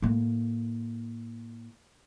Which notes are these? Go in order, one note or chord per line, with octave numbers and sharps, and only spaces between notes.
A2 A#3